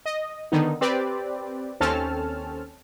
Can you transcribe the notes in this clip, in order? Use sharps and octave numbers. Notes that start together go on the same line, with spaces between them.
D#5
D3 D#3 B3 D#4
C4 G4 B4 D5
D#2 C4 C#4 A4 A5 F6